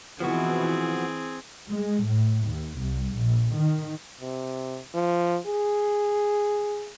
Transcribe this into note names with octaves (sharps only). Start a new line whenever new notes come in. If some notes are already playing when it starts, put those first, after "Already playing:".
B2 E3 F3 B3 C4 F#4 G#4
G#3
A2
D#2
C2
A#1
D#3
C3
F3
G#4